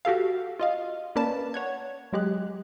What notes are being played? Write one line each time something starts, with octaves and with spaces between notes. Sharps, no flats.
F#4 G4 A4 F5
F4 D#5 F5
A#3 C#4 A#4 B4 D5 A5
C#5 F#5 G#6
F#3 G#3 G4 F#6